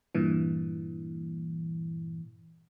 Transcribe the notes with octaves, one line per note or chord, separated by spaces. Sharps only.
G2 A#2 E3